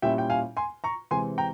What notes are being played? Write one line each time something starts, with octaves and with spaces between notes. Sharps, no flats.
A#2 G3 C#4 E4 E5 G5
G5
F5 G#5
G#5 C6
A#5 C#6
C3 E3 G#3 C4 G#5 C6
G5 A#5